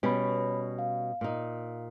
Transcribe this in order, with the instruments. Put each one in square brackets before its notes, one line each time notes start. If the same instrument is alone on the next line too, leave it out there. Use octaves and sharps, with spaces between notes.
[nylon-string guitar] B2 G3 C#4 [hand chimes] C#5 B5
[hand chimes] F5
[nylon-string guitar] A#2 D#4